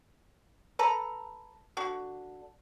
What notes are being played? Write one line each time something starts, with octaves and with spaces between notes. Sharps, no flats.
A4 B4 A#5
D3 F#4